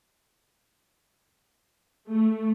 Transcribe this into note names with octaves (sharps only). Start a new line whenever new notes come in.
A3